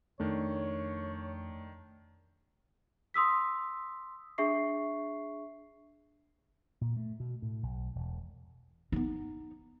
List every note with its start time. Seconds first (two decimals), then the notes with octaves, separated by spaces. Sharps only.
0.20 F2 D#3 A3 D4 C#5
3.14 C6 D#6 E6 B6
4.38 D4 G#4 E5 C#6 C7
6.81 A#2
6.97 A3
7.20 B2
7.42 A2
7.63 B1
7.95 E1
8.92 B3 D#4